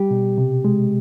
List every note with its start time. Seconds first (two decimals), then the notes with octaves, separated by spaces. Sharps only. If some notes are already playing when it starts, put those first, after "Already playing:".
Already playing: G3 G4
0.11 B2
0.38 C3
0.65 G#3